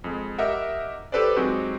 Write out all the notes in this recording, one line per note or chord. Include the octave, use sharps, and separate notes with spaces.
F2 G#3
G4 A#4 D#5 E5 F#5
G4 A4 B4 C5 D5
F#3 G#3 C4 D#4 F#4 G4